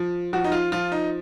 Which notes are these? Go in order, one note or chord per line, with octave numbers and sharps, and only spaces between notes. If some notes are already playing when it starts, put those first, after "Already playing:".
Already playing: F3
F3 F#4
D#4
F4
F3 F4
D#4